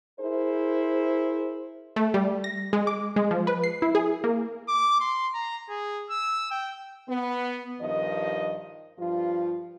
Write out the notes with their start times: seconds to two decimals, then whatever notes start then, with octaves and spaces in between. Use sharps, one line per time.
0.19 E4 G#4 A#4 C5
1.96 A3
2.14 G3
2.44 A#6
2.73 G#3
2.87 D6
3.16 G#3
3.31 F3
3.47 B4
3.64 C7
3.82 E4
3.95 G#4
4.24 A#3
4.68 D6
5.00 C6
5.34 A#5
5.69 G#4
6.10 E6
6.51 G5
7.09 B3
7.81 G2 D#3 F3 D#5
8.98 G2 F3 F4